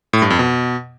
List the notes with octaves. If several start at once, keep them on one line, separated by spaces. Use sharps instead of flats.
A2
G2
F2
B2